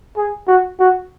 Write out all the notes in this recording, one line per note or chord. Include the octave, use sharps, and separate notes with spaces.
G#4
F#4
F#4